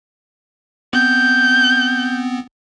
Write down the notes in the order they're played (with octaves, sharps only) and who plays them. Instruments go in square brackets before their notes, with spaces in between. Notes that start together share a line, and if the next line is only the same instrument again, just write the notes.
[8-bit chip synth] B3 C4 [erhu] G6